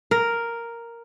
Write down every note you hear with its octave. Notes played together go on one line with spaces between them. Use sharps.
A#4